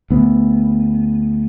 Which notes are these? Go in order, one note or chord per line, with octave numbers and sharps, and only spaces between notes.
D2 B3